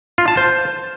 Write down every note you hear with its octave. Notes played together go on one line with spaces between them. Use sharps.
F4
A5
C5